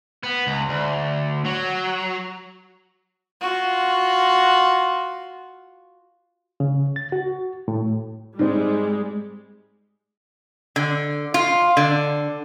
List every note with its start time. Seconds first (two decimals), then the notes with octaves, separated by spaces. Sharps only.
0.23 B3
0.47 C#2
0.69 D2
1.46 F#3
3.41 F4 F#4
6.60 C#3
6.96 A6
7.12 F#4
7.68 A2
8.39 G#2 G3 G#3 C4
10.76 D3
11.34 F4
11.77 D3